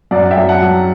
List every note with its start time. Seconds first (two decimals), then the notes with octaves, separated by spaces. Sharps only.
0.11 F#2 D5 F#5
0.31 E5 G5
0.37 F#2
0.49 F#5 A5
0.61 F#3